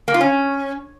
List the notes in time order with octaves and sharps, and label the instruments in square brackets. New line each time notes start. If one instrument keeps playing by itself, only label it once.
[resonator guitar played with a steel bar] A#3
F4
C#4